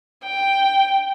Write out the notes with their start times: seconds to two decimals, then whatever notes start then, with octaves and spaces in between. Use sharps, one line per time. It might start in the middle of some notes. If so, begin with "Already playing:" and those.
0.24 G5